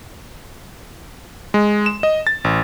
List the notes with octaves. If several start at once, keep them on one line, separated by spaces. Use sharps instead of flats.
G#3
E7
D#5
A6
A1